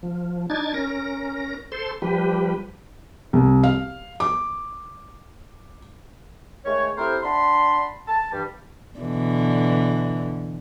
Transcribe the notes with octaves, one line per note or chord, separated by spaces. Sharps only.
F3
D4 D#4 G#6 A6
C#4 A#4 A#6
A4 C5 C6
F3 G3 G4 B4
C2
F5
D6
D#3 G#3 A3 C#5
C4 E4 G4 A4 A#4 C5
D4 F#5 A5 B5 C6
A5
G2 E3 G3
B2 D3 E3